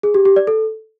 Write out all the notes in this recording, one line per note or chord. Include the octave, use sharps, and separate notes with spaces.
G#4
G4
G4
D5
A4